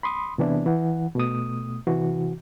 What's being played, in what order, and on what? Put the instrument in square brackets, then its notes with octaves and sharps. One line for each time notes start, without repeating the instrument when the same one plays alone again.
[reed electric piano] B5 C6 D#6
C3 E3 B3 D4 E4
E3 F#5
B2 A3 D#6
C3 E3 F#4